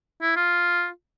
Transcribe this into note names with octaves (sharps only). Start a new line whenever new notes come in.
E4
F4